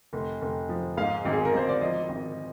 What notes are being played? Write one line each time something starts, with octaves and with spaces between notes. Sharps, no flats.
F1
F1
F3
G#2 F5
G#1
G#4
A#4
G#1 C5
D5
F3 D#5
G#1